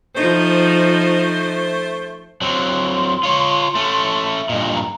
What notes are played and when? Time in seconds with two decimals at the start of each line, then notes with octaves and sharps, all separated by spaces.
0.16 F3 A3 D#4 C5
2.41 F#3 C4 C6
3.23 F4 C#5
3.75 A3 C#4
4.49 G2 A#2 D#5
4.75 A#5